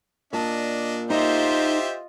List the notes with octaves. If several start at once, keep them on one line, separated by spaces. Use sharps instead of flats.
A#2 D4 D#5 A5
D#4 F4 G4 C5 D#5 E5